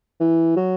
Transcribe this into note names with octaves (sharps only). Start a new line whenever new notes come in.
E3
F#3